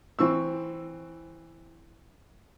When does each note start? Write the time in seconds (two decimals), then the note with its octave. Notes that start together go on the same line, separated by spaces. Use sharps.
0.19 E3 C4 C#6 E6